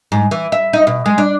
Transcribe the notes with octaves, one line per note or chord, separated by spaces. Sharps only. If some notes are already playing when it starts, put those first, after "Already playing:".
G#2
E3
E5
D#4
B2
G#3
D4